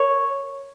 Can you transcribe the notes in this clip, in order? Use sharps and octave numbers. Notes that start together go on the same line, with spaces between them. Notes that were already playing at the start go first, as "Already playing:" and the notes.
Already playing: A#4 C#5